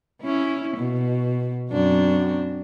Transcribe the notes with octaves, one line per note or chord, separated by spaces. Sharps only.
C#4 E4
B2
F#2 C4 D4